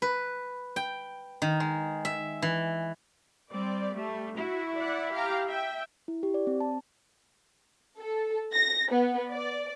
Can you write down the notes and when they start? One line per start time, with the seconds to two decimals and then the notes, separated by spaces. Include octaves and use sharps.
0.02 B4
0.76 G5
1.42 D#3
1.60 G#3
2.05 E5
2.42 E3
3.51 G3 C4 D5
3.95 G3 A3
4.37 E4 F#4
4.77 D5 F#5
5.12 G4 F5 A#5
5.48 E5 G5
6.08 E4
6.23 G4
6.34 D5
6.47 C4
6.61 A5
7.99 A4
8.54 A#6
8.91 B3
9.30 D5